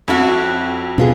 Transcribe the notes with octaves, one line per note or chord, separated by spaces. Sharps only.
F2 C#4 E4 F#4
B2 B3 F4 G#4